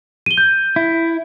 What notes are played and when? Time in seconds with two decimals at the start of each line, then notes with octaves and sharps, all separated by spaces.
0.26 D#7 G7
0.37 G6
0.76 E4